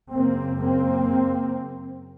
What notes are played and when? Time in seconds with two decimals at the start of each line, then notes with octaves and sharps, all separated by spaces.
0.12 F#2 C#3 A#3 C4
0.60 A#3 C4